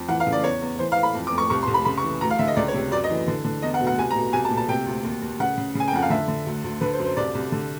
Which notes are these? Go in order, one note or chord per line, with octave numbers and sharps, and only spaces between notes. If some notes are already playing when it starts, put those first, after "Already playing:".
Already playing: F2
E3 F#5
F5
C#3
D5
E2 C#5
E2
E3 C5
F5
E3
B5
F2
D6
F2
C#6
C2 C#6
C6
C2
B5
C#3 B5
C#6
E3
D2 A#5
F5
D3 E5
D#5
C#2 D5
C#5
C3
F#2 D5
D#5
E3
D3
D3
E2 D#5
F#5
B2
F#5
C2 G#5
A#5
B2
C2 G#5
A5
A#2
A5
C3 G5
D2
D#2
D#2
C#3 F#5
C#3
C#3 G#5
G5
F2 F#5
F5
D3 E5
D3
D2
D2
D3 B4
C5
F#2
C5
C2 D5
C2
D3